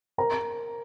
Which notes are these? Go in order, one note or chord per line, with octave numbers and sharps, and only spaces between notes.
A#4 A#5